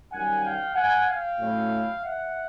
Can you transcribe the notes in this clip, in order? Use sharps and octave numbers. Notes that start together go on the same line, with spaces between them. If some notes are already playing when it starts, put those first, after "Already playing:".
F#2 D#3 G3 F#5 G#5
F5 G5
F#5 G#5
F5 G5
A2 F#3 A3 C#4 E4
E5 F#5